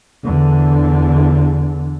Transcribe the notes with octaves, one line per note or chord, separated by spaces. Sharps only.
E2 D3